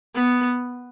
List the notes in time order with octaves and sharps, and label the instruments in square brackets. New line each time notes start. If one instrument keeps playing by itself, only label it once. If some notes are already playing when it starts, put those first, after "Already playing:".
[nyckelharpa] B3